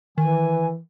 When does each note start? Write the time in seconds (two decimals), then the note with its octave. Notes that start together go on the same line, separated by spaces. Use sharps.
0.18 D#3 E3 G#5